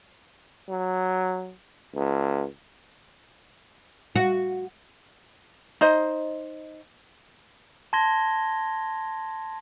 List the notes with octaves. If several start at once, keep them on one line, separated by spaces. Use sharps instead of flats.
F#3
C#2
F#4
D#4 C5 D#5
A5 C6 G#6 A#6 G7